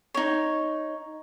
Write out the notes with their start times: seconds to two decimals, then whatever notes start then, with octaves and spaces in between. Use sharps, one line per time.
0.14 D#4 C#5